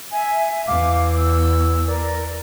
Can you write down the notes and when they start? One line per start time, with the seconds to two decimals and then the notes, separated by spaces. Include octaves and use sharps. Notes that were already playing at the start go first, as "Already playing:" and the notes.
0.12 E5 G#5
0.67 E2 F5 D6
1.17 E6
1.87 A#4 D5